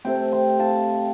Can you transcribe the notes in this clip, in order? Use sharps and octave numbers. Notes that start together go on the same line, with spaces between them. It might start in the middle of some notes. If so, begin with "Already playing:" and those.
C3 A3 C4 G5 C6
G5 C6
F5 A5